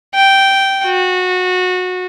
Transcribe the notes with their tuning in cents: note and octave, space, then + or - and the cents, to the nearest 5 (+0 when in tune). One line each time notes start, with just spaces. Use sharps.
G5 -10
F#4 -20